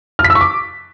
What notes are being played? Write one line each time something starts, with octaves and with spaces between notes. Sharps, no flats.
F6
B6
E6
C#6
D6